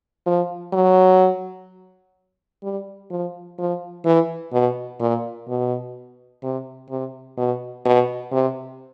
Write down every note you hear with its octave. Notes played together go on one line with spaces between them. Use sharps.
F3
F#3
G3
F3
F3
E3
B2
A#2
B2
C3
C3
B2
B2
C3